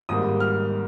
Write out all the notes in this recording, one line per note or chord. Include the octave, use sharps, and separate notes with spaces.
G#1 G#2 G3 A#3 D#6
F6